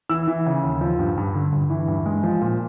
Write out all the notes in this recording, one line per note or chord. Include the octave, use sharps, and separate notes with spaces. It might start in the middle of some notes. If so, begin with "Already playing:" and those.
E3 E6
E3
C#3
D#2
F3
G2
G2
D3
G2
E3
G2
G#3
F3
A#2